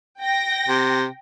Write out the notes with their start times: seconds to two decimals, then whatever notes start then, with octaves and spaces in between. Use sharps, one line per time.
0.21 G5 A#6
0.68 C3